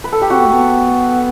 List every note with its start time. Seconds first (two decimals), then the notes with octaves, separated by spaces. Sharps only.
0.04 B4
0.12 A4
0.21 G4
0.30 C4 F#4
0.38 B3
0.46 A3
0.53 B3